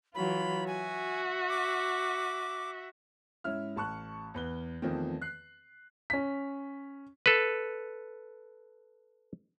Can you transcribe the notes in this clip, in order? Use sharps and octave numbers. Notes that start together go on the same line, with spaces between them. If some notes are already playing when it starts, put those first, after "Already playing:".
E3 F#3 F4 B5
F#4 E5 G#5
D6
G#2 C#4 E4 E5 F6
A1 A5 C#6 F#6
E2 B4 G7
E2 D#3 F3 A3 C4
F#6 C7
C#4 B6
A4 B4